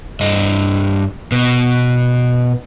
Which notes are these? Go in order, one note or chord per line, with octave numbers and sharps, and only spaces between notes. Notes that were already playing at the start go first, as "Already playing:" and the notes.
G2 D#5
B2